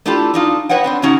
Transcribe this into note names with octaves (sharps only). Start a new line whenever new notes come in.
A3 D4 E4 F4 G4 A4
D4 D#4 F4
B4 C#5 D#5 F#5 G5
B3 C4 D4
F#2 C#3 F#3 C#4 D#4 F#4